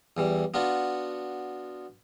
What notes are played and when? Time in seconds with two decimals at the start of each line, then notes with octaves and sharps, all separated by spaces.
0.17 E2 E3 G3
0.54 B3 D4 F4 F#4